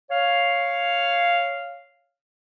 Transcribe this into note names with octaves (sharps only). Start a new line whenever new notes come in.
C#5 F5